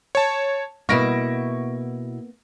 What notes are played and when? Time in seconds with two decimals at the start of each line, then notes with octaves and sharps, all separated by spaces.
0.15 C#5 A5
0.89 B2 A#3 B3 E4 F5 C#6 A#6 D7